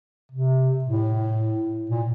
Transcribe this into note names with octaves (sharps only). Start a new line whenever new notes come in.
C3
A2
A#2